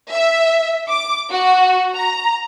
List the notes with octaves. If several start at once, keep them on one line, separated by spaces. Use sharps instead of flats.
E5
D6
F#4
A#5